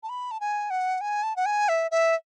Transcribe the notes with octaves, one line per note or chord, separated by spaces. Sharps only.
A5
B5
A5
G#5
F#5
G#5
A5
F#5
G#5
E5
E5